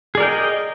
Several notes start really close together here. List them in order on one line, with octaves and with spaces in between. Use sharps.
G#4 D5 A#4 G5 D#5